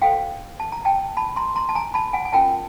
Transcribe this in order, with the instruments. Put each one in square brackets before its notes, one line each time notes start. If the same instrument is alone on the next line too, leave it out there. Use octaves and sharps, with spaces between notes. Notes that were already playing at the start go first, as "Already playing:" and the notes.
[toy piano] F#4 A4 C5 F5 G5
A5
A#5
G5 A5
A5 B5
A#5 C6
A#5 C6
A5
G#5 A#5
A5 B5
F#5 G#5
G#5
C#4 F4 A#4 C#5 G5 A5